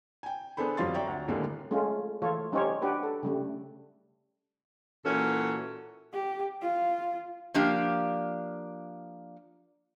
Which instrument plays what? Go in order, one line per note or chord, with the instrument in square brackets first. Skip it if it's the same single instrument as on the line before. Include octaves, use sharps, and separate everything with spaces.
[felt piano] G5 G#5
B3 D4 G#4 A4 C5 B5
F2 F#3 G3 F4 C6 A6
C#5 D5 E5 G5 A#5 C#6
D2
D#2 A2 D3 G3 G#3 A#3
[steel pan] G#3 A3 C#4 F4
E3 A3 F4 A4 C#5
G3 C#4 D#4 G4 C5 C#5
D4 F#4 G4 B4
A4
C#3 G3 A3
[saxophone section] A#2 E3 C#4 F#4 A4
[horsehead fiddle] G4
F4
[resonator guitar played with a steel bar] F3 A#3 D4 G4 D5